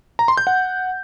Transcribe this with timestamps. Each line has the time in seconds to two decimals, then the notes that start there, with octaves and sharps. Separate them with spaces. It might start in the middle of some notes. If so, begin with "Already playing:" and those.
0.19 A#5
0.28 C6
0.37 G6
0.47 F#5